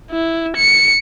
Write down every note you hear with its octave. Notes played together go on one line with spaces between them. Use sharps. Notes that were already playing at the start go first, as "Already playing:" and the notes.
E4
C#7